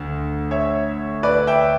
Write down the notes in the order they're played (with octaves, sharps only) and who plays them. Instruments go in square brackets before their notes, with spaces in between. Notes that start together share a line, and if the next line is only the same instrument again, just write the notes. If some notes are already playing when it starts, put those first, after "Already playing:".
Already playing: [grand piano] D2 D3
C#5 E5
B4 D5
E5 G5